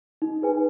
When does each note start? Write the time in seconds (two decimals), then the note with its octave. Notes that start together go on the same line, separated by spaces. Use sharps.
0.22 D#4
0.42 G#4 B4 G#5